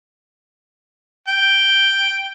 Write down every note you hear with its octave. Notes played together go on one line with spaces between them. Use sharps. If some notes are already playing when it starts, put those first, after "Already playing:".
G5